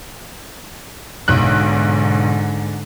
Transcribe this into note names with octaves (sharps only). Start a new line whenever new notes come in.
B1 G#2 D3 F#6